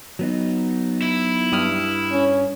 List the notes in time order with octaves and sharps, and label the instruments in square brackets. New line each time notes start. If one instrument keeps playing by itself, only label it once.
[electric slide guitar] F#3 B3 D#4
[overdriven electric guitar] E4
[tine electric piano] G2 D#6 F6
[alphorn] C#4